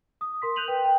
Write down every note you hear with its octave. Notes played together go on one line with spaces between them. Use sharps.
D#6
A#4 C6 B6
F#6 G6 D#7 F7 F#7
B4 G5
G5